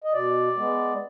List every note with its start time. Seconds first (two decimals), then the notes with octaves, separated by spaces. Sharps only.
0.04 D#5
0.13 B2 D5
0.57 G#3 B3